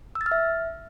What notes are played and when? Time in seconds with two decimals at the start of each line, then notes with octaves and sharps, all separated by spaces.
0.15 E6
0.21 A6
0.26 F6
0.32 E5